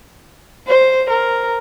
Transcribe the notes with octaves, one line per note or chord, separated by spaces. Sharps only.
C5
A#4